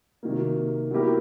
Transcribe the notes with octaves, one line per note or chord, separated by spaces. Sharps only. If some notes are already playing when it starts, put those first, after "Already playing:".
C3 D#3 F#3 A#3
F#3 B3 E4 G4 A#4